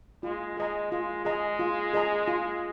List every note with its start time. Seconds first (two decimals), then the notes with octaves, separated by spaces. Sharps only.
0.23 G#3 F4
0.57 G#3 G#4 D#5 A#5
0.92 G#3 F4
1.25 G#3 G#4 D#5 A#5
1.59 F4
1.93 G#4 D#5 A#5
2.27 F4